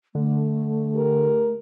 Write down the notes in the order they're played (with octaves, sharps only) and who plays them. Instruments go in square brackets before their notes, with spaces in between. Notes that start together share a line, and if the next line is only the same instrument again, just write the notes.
[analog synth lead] D3 [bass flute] A3
[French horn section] G4 A#4